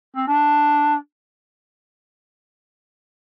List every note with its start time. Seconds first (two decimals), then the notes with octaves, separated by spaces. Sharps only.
0.16 C4
0.28 D4